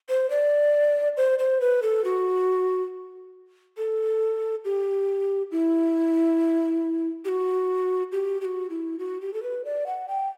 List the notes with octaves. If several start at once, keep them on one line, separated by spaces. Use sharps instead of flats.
C5
D5
C5
C5
B4
A4
F#4
A4
G4
E4
G4
F#4
G4
G4
F#4
E4
F#4
G4
A4
B4
D5
F#5
G5